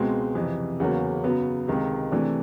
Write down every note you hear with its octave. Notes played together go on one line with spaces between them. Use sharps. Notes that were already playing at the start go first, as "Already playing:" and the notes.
Already playing: C#2 B2 G#3 C4
F2 C3 E3
E2 C#3 F#3 A#3 C#4
F#2 C#3 F#3 B3
C#2 C3 D#3
C3 E3 A3 D4